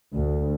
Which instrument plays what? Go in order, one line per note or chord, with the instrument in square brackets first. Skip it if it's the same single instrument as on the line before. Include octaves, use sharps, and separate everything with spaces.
[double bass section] D2